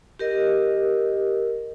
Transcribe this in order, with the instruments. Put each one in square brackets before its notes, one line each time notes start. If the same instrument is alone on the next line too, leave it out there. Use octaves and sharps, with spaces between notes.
[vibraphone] G4 A#4 D#5